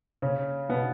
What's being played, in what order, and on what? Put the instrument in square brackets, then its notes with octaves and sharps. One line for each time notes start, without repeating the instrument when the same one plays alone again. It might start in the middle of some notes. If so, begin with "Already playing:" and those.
[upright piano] C#3 C#4
B2 B3